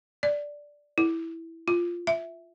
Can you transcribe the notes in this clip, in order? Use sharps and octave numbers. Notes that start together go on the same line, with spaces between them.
D5
E4
F4
E5